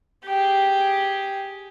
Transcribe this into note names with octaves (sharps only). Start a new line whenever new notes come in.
G4 G#4